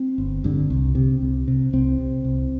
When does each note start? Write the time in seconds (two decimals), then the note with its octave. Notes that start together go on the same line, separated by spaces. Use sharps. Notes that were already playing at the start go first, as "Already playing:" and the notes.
Already playing: C4
0.18 G1
0.44 G2 D3
0.70 C2
0.95 C3
1.22 C2
1.48 C3
1.73 C2 C4
1.99 C3
2.24 C2